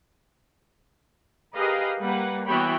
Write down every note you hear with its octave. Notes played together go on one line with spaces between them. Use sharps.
G4 G#4 A#4 B4 D#5 F5
G3 A#3 B4 F#5
E3 B3 F#4 C#5 G5 B5